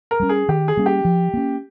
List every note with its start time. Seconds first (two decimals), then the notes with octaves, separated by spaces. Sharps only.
0.11 A#4
0.20 G3 A#3 C#4
0.29 G#4
0.49 D#3 G4
0.68 G#4
0.77 G3 A#3 C#4
0.86 G4
1.05 F3
1.34 A#3 C#4